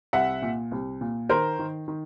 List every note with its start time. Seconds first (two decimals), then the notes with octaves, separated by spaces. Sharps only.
0.13 C2 E5 F#5
0.42 A#2
0.71 C2
1.01 A#2
1.29 D#3 A#4 C5
1.59 D#3
1.88 D#3